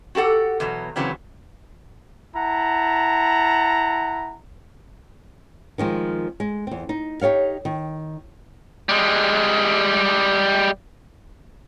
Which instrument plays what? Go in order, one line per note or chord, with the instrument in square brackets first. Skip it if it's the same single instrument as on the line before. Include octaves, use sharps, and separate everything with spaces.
[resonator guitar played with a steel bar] F#4 G4 A4 F#5
E2 B2 F#3
C#3 E3 F#3 C4
[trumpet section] E4 F#5 A5 A#5
[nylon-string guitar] D#3 F3 G#3 C4
G#3
E2 C4
D#4
D#4 G4 A4 C#5 F5
D#3
[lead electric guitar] G3 G#3